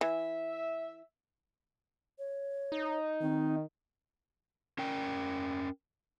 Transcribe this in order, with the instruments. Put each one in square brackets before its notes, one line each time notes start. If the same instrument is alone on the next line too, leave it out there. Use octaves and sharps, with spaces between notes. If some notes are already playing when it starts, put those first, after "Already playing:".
[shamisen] E3 [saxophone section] E5
[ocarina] C#5
[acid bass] D#4
[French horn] D#3 [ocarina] C4
[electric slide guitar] C#4 A#4 G5